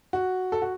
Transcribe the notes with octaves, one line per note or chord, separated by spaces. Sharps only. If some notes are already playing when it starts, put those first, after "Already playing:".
F#4
A4
F#4